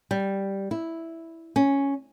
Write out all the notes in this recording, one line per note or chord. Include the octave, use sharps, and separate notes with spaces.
G3
E4
C#4